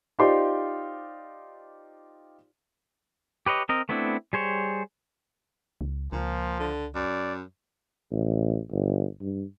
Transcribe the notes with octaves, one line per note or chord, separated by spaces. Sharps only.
D#4 F4 G4 C5 D5 C6
G4 B4 C#5 D#5
C4 A#4 D#5
A3 B3 C4 D4 E4
G3 G#4 C5 C#5
C#2
C#2 A#2 F3
D3
F#2 D5
A1
G1
G2